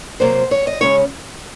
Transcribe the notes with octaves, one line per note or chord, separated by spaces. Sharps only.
C3 F#3 A#3 C5
C#5
D#5
C#3 G#3 C#4 C#5